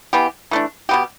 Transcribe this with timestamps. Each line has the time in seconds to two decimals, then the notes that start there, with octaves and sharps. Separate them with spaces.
0.13 E3 B3 G4
0.51 E3 A3 D4
0.89 B2 B3 G4